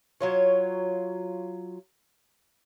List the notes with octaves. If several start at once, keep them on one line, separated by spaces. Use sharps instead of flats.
F#3 F4 C#5